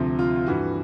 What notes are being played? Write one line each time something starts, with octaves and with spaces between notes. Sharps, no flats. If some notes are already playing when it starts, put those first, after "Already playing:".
Already playing: D2 C3 F3
F4
F4
G2 E3 F#4